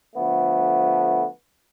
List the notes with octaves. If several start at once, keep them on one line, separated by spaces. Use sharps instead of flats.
D3 F3 A3 B3